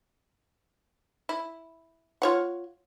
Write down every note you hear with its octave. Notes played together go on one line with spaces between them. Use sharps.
E4
F4 C#5 F#5